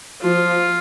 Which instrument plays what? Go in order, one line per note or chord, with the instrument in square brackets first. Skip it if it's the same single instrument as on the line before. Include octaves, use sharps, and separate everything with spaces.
[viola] F3 [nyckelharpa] F4